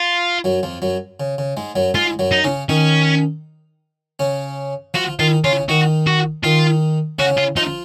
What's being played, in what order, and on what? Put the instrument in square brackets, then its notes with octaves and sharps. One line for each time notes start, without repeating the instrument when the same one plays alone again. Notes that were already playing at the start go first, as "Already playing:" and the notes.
Already playing: [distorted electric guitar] F4
[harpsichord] F#2 F#3
F2 F3
F#2 F#3
C#3
C#3
G#2 G#3
F#2 F#3
[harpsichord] G#2 G#3 [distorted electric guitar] F4
[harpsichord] F#2 F#3
[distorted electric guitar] D#4
[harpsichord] C#3 C#4
[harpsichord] D#3 D#4 [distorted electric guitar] C#4
[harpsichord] C#3 C#4
[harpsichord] F3 F4 [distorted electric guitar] F#4
[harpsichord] D#3 D#4 [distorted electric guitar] F4
[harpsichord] C#3 C#4 [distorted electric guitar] F4
[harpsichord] D#3 D#4 [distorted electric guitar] F#4
[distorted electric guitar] F#4
[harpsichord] D#3 D#4 [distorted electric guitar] F4
[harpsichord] C#3 C#4 [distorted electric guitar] F#4
[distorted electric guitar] F4
[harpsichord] F3 F4 [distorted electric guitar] D#4